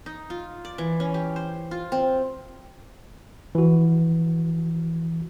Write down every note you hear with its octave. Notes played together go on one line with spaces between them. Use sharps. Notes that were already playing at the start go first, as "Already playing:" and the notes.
D#4
F4
D5
E3
C#4
G4
C5
F4
C4
E3 F#4